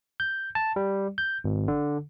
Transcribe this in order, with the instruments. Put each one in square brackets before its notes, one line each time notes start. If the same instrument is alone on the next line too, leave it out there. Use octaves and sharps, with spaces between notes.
[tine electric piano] G6
A5
G3
G6
G#1
D3